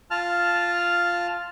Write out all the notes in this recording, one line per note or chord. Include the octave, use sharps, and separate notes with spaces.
F4 A5 F6